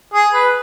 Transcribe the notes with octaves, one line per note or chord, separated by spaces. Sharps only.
G#4
B4